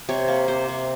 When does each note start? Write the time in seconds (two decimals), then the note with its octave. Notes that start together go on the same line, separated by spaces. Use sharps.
0.09 C3 C#5
0.28 A#3
0.48 C3 C5
0.68 C3